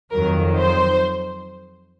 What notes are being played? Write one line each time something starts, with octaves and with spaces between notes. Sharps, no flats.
F2 D#3 F#3 A#4
C5